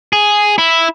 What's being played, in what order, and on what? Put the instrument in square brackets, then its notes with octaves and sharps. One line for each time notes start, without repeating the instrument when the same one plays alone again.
[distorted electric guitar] G#4
E4